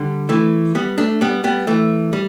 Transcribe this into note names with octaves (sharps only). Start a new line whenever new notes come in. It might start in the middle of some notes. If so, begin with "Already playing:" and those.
Already playing: D3 G3
E3 A3
G3 B3
A3 D4
G3 B3
G3 B3
E3 A3
G3